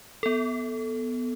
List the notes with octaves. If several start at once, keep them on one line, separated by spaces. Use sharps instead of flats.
B3 A4